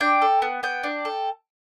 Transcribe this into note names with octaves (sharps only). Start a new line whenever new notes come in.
D4 G5
A4
B3
B3 G5
D4
A4